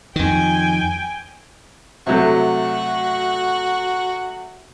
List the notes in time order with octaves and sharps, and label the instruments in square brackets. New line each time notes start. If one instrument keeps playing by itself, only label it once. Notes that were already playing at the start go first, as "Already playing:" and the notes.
[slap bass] F2 D#3 [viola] G5 G#5
[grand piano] C3 F#3 A3 [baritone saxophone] F#4